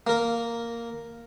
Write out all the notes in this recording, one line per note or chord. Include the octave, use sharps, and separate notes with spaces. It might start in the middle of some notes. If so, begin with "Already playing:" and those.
A#3 A#4